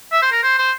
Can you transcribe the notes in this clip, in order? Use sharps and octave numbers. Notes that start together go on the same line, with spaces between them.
E5
C5
A#4
C5
C5